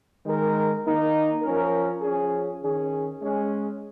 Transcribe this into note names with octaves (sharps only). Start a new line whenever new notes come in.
D#3 G#3 D#4 A#4
D#3 A#3 D#4 A#4
F3 C#4 A#4
F3 C#4 G#4
D#3 C#4 G#4
G#3 C#4 G#4